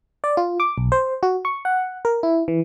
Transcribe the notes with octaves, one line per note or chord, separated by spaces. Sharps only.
D5
F4
D6
B1
C5
F#4
C#6
F#5
A#4
E4
E3